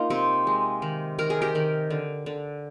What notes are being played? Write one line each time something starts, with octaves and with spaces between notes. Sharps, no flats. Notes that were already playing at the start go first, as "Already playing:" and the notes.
Already playing: A#3 D#4 F4
C3 C4
G#3
D#3
D#3 A#4
G#4
G4 A#4
D#3
D3
D3